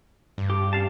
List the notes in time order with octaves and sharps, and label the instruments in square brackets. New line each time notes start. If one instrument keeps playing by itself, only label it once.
[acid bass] G2
[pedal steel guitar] G4
C#4 F5 A5